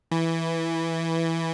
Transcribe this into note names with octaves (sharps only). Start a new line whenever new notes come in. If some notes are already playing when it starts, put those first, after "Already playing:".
E3